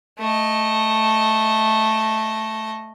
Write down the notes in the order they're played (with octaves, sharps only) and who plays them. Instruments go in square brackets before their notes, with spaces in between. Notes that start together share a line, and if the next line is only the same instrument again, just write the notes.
[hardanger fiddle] A3 D#5